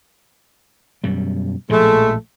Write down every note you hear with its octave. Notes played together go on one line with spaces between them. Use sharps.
F#2 B2 G3
A#1 A2 F3 G#3 A3